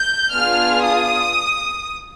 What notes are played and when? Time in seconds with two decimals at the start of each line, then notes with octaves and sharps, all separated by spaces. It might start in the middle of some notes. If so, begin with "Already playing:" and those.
Already playing: G6
0.32 B3 D4 F4 G#4 F6
0.84 D#6